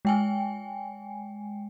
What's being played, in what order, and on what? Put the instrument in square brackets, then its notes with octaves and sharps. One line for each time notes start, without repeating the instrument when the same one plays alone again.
[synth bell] G#3 G5 G#5